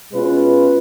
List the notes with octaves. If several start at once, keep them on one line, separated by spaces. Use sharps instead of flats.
B2 G#3 C#4 F4 B4